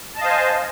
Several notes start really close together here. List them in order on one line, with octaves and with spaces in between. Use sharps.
A5 D#5 F5 C5 G#5